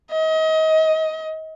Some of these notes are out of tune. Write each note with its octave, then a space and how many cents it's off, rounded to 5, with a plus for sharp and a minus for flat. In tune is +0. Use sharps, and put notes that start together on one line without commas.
D#5 +30